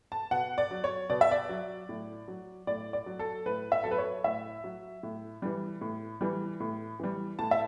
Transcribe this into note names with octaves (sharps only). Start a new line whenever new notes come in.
A5
B2 F#5
D5
F#3
C#5
B2 D5
E5
D5
F#3
A2
F#3
A2 D5
D5
F#3
A4
A2 B4
E5
F#3 A4
B4
C#5
A2 E5
F#3
A2
E3 G3
A2
E3 G3
A2
E3 G3
A2 A5
E5